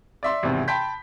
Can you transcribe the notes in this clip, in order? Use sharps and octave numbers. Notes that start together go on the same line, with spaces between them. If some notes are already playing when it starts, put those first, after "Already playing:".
D5 E5 C6
G#1 E2 C3
G5 A5 B5 C6 G6 B6